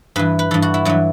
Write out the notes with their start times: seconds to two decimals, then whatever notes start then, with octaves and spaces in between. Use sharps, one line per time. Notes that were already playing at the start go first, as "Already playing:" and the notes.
0.16 G2 E3 B4
0.39 B4
0.51 G2 E3 A4
0.62 F#4
0.74 E4
0.85 G2 E3 F#3